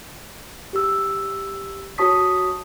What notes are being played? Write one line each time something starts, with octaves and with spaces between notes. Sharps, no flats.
G4 E6
F#4 C#5 A5 C#6 D#6 B6